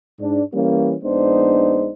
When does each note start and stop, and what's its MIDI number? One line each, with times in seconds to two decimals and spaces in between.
0.20 0.41 44
0.20 0.41 62
0.54 0.95 52
0.54 0.95 55
0.54 0.95 58
0.54 0.95 61
1.04 1.92 34
1.04 1.92 56
1.04 1.92 59
1.04 1.92 62
1.04 1.92 63
1.04 1.92 72